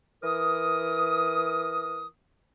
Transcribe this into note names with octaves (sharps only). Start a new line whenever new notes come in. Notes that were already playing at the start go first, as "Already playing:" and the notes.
E3 A#4 D#6